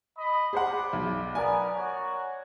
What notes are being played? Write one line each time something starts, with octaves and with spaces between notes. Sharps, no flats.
D#5 B5
G3 B3 G#4 C5 F#5 D6
B1
B3 A#4 D5 G#5
F#4 C#5